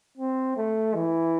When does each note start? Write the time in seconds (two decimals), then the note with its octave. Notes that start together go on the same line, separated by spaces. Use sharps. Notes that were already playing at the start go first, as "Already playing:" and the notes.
0.17 C4
0.56 A3
0.94 E3